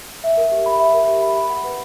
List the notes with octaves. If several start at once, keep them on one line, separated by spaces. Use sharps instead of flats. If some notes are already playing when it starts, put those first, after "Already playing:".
E5
A#4
G4
B5
E5
A#4
G4
B5
B5
F#5
B4